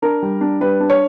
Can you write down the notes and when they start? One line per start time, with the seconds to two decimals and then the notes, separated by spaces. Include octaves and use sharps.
0.02 D4 A#4
0.23 G3
0.41 D4
0.61 G3 B4
0.80 D4
0.90 C#5